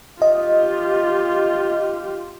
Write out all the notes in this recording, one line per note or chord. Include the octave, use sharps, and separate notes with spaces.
F4 G4 D#5